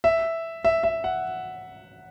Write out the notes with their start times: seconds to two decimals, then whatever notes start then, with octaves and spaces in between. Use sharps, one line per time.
0.04 E5
0.64 E5
0.84 E5
1.04 F#5